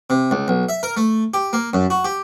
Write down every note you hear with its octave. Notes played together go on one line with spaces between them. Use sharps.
C3
C#2
B1
E5
A#4
A3
G4
A#3
F#2
F#4
G4